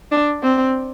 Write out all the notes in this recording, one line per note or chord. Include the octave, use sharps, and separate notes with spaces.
D4
C4